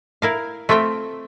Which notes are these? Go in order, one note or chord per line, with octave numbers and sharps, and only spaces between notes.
E4 A#4 F5
A3 C4 F4 E5 G5